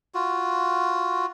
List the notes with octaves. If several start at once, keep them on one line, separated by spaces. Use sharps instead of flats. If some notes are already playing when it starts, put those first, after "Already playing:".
F4 F#4